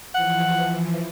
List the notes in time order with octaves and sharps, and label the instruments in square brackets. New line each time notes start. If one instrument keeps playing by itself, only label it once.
[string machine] E3 F3 [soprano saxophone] F#5